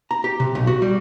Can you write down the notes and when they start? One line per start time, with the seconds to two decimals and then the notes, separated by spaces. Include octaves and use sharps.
0.11 A#5
0.24 G4
0.40 C3
0.55 B1
0.67 F#4
0.82 G3